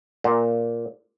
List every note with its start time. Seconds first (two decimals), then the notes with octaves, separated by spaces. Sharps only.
0.24 A#2